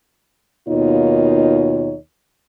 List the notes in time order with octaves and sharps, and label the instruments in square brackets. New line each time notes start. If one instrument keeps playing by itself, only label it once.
[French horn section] D#2 B2 A#3 D#4 F4 C#5